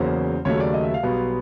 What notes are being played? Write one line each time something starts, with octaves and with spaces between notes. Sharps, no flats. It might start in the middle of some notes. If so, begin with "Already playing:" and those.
Already playing: E2 C#3 F#3 A#3 C#4 C5
D#2 C#3 F#3 A3 C#5
D5
D#5
E5
F5
B1 B2 G3 B3